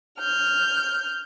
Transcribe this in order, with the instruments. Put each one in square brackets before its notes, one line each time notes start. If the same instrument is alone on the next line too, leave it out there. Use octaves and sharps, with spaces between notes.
[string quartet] F6 G6